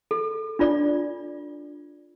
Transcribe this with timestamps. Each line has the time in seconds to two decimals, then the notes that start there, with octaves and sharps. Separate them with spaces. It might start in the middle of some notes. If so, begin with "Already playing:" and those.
0.11 A4
0.59 D4 F4 D5